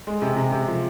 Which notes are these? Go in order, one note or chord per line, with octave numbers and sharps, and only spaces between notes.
G#3
C3
C3
C3
F3